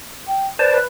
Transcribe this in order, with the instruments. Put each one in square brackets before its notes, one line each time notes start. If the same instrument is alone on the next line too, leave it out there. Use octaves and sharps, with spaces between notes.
[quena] G5
[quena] B4 [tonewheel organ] C5 D5 A5
[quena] B4